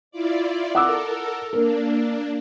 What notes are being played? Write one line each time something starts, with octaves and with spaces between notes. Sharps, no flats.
E4 F4 D5
A4 A#4 F#5 D6 E6
A#3 D4 A#4